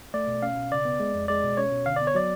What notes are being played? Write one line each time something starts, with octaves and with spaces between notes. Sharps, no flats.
A3 D5
B2
C#4 F5
B2
C#3 D5
B3
G#3
F2
G#3 D5
B2
C#4 C#5
B2
D3 F5
B3 D5
C#5
F#3 D5